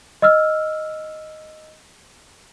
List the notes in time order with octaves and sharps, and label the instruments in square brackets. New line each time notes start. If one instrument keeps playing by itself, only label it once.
[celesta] D#5 E6 F6